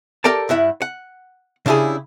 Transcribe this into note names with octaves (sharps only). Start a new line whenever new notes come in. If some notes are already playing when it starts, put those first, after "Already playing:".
G4 A4 A#4 D5 G5 A5
G2 E4 E5 F#5
F#5
C#3 D4 E4 G4 G#4